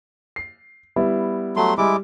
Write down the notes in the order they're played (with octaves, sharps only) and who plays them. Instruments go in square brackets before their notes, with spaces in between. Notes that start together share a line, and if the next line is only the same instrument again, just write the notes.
[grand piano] C7
G3 B3 E4
[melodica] F#3 A3 C6
[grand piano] G3 [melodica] G#3 E4 D6